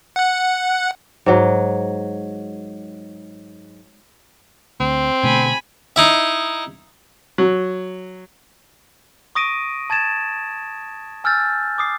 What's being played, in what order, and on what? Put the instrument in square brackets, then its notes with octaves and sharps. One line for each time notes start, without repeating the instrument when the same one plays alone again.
[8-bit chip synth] F#5 F#6
[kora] G#2 F#3
[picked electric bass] D2 [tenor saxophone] C4
[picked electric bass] B2 D3 A3 [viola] G#5 B5
[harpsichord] D#4 E4 E5
[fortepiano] F#3
[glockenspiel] C#6 D#6 A#6 D7 D#7
A5 G#6 A6 E7
G#5 E6 F6 G6 A6
D6 D#6 C7